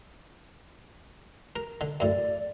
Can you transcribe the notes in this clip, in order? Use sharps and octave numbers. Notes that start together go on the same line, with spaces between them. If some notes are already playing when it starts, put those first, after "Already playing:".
A#4
D3
F#2 A2 D5